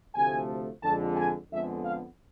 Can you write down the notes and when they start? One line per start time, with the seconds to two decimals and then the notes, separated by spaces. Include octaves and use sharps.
0.15 D2 C3 F3 A3 G#5
0.82 F2 D3 G#3 A5
1.17 G#5
1.50 F2 D3 G#3 B3 E5
1.84 F5